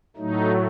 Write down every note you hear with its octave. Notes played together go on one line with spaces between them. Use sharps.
A2 F#3 A3 D#4